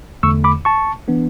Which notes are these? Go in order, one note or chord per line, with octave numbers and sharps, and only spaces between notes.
E2 D3 A3 C#6 E6
B5 D6
A5 C#6
E3 B3 D4